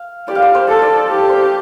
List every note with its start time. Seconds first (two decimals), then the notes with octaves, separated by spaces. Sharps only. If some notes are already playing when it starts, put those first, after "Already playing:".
Already playing: F5
0.28 G4 D5
0.35 F5
0.42 D5
0.55 C5
0.68 A4
0.82 D5
1.09 G4
1.29 C5